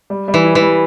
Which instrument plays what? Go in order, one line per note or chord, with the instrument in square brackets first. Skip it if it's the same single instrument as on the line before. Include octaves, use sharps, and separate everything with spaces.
[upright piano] G3
G3
[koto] E3
[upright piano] E4
[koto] E3
[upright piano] G3